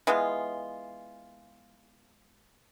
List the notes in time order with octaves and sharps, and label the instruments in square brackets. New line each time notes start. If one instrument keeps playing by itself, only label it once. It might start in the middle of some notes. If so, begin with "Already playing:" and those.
[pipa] E3 G#3 B3 F4